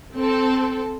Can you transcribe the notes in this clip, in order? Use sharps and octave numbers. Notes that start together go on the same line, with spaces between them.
C4 A4